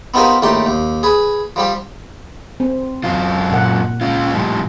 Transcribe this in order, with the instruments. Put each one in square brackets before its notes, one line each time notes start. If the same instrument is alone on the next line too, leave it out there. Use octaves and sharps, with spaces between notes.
[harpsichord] B3 C4 D#4 F4 G4 A#4
A#1 A2 D#3 G4 C6 D6
D#2
G#4 B4
F3 G3 G4
[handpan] C4
[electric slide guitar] F#2 F#3 F4
[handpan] A#2 F#5
[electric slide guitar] C#4 F4
A2 F3 G3